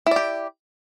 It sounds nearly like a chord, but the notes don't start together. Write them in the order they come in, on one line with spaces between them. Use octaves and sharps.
E4 D5 G4